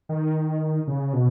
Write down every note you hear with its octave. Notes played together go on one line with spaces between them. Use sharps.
D#3
C#3
B2